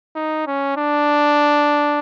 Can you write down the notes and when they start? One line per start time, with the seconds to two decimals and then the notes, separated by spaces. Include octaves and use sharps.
0.16 D#4
0.47 C#4
0.77 D4